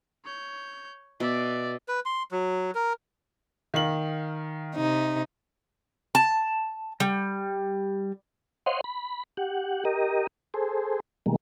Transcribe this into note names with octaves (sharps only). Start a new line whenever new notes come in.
C#5 G6
B2 D5 E5
B4
C6
F#3
A#4
D#3 F5 F#7
C3 D#4
A5
G3
C5 C#5 D#5 F5 F#5 C6
B5
G4 F#5
G4 A#4 D#5
G#4 A4 C5
B2 D#3 G3 G#3 A#3